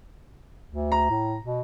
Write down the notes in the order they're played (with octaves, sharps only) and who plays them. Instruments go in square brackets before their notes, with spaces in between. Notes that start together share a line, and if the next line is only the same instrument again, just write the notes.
[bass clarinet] D2
[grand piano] A#5
[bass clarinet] A2
B2